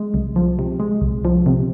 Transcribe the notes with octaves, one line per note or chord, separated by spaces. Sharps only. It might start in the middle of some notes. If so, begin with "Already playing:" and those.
Already playing: G#3
C2
F3
C3
G#3
C2
F3
C3